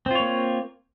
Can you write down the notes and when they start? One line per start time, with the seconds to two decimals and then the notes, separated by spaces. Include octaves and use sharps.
0.06 C4
0.11 F4
0.15 C#5
0.20 A#3